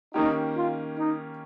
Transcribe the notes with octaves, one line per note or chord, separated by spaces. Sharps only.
D#3 A#3 C#4 D#4 G4
F4
D#4